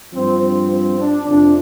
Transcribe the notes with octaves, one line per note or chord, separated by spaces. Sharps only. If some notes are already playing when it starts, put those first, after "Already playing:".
G2 F3 C4
C4
C4
D4
F2 C3 F3 D4